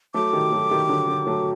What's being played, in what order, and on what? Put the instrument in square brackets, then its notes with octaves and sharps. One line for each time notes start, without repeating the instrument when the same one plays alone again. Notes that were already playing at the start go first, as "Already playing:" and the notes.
[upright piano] F#3 A3 [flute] D6
[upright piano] D#3 G3
F#3 A3
D#3 G3
D3 F#3
D3 F#3
F#3 A3